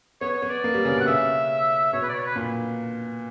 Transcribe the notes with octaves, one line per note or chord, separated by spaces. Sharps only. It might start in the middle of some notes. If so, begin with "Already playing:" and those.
B3 C#5
C#5
B3
D5
A#3
G3
C#3
B2
F#5
C#3 E5
B2 C#5
B4
D5
C#5
B4
A#2